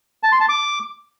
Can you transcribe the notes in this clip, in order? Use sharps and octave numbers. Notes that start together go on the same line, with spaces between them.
A5
C6
A5
D6